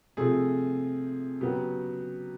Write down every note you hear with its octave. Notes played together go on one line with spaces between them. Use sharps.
C3 F3 A3 G#4
C#3 F#3 B3 G4